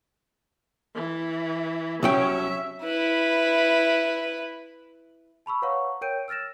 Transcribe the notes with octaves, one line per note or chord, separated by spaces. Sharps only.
E3
C2 F#3 C#4 E5 G5
E4 B4
A5 B5 C#6 E6
B4 C#5 F5 F#5 A#5 C#6
A#4 C#5 G5 G6 D7 D#7
E6 F6 A6 A#6 E7